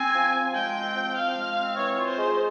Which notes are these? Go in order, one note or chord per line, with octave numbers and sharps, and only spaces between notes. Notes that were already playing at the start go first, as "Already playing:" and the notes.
Already playing: C4 G#5
F3
F3
G#3 G5
C4
F3
F3 F5
G#3
C4
E3 C#5
F4
C5
G#3